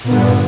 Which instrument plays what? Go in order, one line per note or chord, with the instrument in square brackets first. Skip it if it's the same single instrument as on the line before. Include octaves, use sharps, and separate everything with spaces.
[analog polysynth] A#2
B3
D3
G2